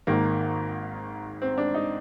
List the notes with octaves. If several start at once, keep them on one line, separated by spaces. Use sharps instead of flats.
G#1 G#2 D#3 A#3
C4
D4
D#4